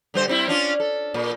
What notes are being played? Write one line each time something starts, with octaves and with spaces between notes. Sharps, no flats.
D3 G3 C5
G3 C4 E4
C#4 D4 F4
A4
A#2